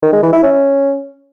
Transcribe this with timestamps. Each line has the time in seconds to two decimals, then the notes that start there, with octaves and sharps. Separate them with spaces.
0.02 D#3
0.12 G#3
0.22 E3
0.33 E4
0.43 C#4